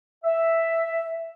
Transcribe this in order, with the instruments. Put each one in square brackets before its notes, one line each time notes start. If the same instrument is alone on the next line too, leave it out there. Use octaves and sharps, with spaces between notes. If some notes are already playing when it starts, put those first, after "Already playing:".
[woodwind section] E5